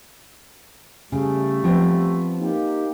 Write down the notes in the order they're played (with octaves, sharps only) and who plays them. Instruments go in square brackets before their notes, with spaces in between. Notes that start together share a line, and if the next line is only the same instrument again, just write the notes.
[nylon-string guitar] C#3 [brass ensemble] G3 A3
[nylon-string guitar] F3 B3 C4
[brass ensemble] A#3 D#4 G4